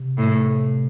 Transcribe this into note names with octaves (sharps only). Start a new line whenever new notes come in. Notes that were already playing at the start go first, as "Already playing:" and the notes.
Already playing: C3
A2